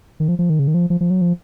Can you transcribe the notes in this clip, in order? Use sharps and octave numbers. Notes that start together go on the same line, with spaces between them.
D#3
F3
F3
D#3
C#3
D#3
F3
F3
F3
F#3
F3